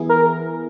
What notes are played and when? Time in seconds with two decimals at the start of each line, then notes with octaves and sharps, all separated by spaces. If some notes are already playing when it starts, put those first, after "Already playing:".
Already playing: E3 B3 E4 G#4
0.09 A#4